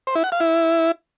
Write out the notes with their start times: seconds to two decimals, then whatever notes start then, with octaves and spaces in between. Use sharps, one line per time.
0.07 C5
0.15 E4
0.24 F#5
0.32 F5
0.40 E4